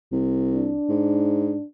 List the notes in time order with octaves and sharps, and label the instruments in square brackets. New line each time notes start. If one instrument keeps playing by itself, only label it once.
[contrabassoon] C2
[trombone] D4
[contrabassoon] G#2